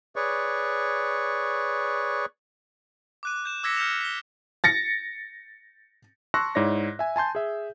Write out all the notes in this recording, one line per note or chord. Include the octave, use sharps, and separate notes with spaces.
G#4 B4 C#5 D5 C#6
D6 F#6 D#7
G6 E7
D6 E6 G#6 A#6 B6 C#7
F6 G6 B6 C#7 E7 F7
B6 G7
A6 A#6 C#7
A5 C6 C#6 E6 F#6 A#6
G#2 E4 C#5 D5 A#6
E5 G#5
G#5 A5 C6 G6
G#4 E5